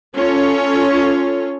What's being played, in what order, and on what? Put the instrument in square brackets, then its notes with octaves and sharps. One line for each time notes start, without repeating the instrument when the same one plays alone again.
[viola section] C#4 F4 A4 C#5